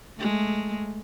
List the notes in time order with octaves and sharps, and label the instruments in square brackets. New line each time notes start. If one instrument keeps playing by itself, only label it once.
[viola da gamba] G#3 A3